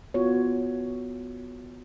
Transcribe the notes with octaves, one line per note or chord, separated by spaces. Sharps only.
B3 F4 F#4 C#5